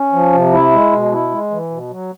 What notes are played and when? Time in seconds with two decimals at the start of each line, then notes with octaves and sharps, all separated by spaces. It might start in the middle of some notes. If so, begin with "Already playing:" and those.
Already playing: C#4
0.13 F3
0.33 C3
0.52 E4
0.72 G#3
0.92 B2
1.12 E4
1.31 G#3
1.51 E3
1.70 B2
1.90 F#3